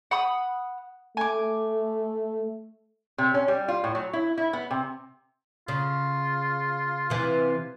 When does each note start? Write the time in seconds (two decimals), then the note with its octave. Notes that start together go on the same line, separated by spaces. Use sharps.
0.11 F#5 B5 D#6
1.17 A3 G#5 D6
3.18 C3
3.34 C#4
3.48 G3
3.68 F4
3.84 A2
3.95 F#3
4.13 E4
4.38 E4
4.53 B3
4.71 C3
5.68 C#3 F4
7.10 C3 E3